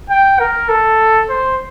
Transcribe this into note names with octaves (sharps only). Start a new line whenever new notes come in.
G5
A#4
A4
C5